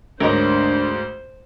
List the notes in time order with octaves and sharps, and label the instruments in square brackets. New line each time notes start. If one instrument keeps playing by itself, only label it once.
[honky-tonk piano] D2 G#2 [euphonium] D4 [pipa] A#4 C#5 D#5 [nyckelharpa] C5